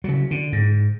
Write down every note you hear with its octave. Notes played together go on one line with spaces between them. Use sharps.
C#3 F#3
D3
G#2